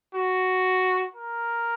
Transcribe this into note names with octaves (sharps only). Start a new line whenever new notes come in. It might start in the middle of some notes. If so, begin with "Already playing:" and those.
F#4
A#4